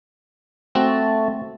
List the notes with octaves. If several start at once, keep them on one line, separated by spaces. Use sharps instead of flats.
A3 C4 F#4